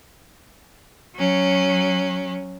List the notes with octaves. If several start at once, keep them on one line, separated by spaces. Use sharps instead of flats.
F#3 C#4